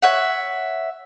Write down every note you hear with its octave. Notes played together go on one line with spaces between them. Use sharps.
C#5 E5 F#5